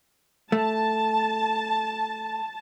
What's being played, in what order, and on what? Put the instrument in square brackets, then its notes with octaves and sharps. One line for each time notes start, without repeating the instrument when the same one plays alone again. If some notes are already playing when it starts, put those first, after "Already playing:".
[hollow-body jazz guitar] A3 [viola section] A5